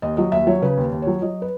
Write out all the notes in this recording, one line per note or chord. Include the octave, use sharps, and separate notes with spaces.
D#2 D#5
F#3 D#5
D#2 E5
F#3 C#5
C#3 B4
D#2
D#2
F#3 C#5
F#3 D#5
B4